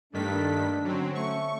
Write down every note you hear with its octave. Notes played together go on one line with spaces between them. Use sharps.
G2 D#3 A3 A#3 D4 A4 B6
D3 F#3 C4 C#4
A3 C#6